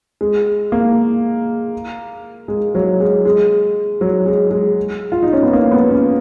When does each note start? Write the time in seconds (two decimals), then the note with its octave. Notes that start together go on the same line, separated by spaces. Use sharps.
0.21 G#3
0.72 A#3
2.48 G#3
2.75 F#3
3.00 G#3
3.25 G#3
4.01 F#3
4.26 G#3
4.51 G#3
5.12 F4
5.23 D#4
5.33 C#4
5.43 B3
5.53 A#3
5.72 B3
5.91 C#4